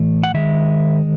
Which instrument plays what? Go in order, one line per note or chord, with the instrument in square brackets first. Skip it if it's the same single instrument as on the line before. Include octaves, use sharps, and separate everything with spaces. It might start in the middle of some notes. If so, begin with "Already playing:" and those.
Already playing: [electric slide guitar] A2 E3 A3
F#5
D#3 G#3 E5